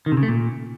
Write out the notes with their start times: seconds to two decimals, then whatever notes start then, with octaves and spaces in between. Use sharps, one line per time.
0.06 D#3
0.12 C3
0.17 C#3
0.23 A3
0.28 A#2